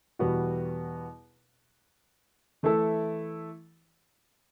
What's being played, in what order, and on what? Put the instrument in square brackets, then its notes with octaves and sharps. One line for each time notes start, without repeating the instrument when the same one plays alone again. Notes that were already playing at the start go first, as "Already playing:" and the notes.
[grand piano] E2 B2 G3 B3 F#4
E3 A3 E4 A4